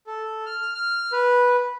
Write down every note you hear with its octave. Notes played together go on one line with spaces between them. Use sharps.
A4
F6
F6
B4